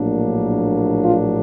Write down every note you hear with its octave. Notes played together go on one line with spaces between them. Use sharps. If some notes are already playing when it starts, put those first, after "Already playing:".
Already playing: A#1 A2 F#3 A#3 D4
F4